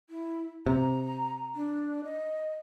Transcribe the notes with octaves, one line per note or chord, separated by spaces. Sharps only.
E4
C3 A#5
D4
D#5